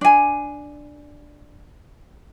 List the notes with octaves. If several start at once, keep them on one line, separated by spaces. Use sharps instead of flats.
D4 G#5